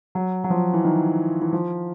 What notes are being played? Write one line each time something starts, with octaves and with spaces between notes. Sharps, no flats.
F#3
F#3
F3
E3
D#3
E3
F3